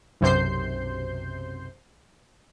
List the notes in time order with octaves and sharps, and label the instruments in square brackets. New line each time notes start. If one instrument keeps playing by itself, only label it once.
[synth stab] B1 F#2 C3 C5 G6 C7